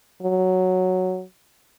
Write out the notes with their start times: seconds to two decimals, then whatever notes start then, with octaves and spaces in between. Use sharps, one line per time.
0.23 F#3